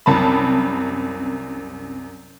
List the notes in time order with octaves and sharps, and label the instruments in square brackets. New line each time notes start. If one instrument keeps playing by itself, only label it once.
[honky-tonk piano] C2 F#2 C3 A5 B5